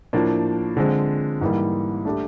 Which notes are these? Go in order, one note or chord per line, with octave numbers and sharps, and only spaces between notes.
A2 F3 A#3 D4
D3 F3 G#3 C4
G#2 E3 G3 A#3
A3 D4 G4